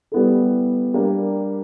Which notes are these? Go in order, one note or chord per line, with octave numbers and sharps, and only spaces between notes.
G3 B3 E4 A4
G3 A#3 D4 G4